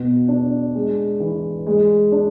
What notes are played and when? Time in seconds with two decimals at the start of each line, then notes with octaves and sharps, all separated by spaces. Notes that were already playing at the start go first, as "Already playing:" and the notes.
Already playing: B2
0.28 D4
0.75 G#3
1.20 E3
1.67 G#3
2.12 D4